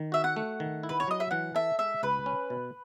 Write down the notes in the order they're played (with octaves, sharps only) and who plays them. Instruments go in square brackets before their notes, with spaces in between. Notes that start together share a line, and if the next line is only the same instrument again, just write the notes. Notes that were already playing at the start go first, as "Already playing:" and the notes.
Already playing: [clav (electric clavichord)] D#3
[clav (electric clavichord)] F#4 [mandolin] E5
[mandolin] F#5
[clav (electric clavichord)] A3
D#3
E4
[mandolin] B4
C#5
[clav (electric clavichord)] F#3 [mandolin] D#5
[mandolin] E5
[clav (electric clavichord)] E3 [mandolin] F#5
[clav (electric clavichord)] A4 [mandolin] E5
[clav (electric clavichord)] G#3 [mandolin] E5
[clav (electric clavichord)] C#2 [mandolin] B4
[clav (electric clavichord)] C#4
B2